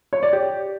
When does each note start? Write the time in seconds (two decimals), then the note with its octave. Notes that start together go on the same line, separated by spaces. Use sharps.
0.13 C#5
0.23 D5
0.33 G4